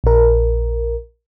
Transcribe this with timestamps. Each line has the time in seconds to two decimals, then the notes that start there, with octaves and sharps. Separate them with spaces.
0.04 A#1 A#4